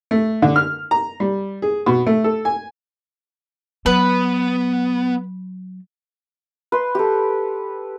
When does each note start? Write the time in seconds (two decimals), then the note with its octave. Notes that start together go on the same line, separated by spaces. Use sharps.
0.11 A3
0.42 D3
0.56 F6
0.91 A#5
1.20 G3
1.62 G#4
1.86 B2
2.07 A3
2.24 A4
2.45 G#5
3.86 F#3 B3 B4
6.72 B4 C6
6.95 G4 A4